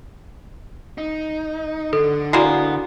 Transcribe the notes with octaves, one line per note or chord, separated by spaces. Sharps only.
D#4
D3 A4
G#3 A#3 B3 E4 F#4 D5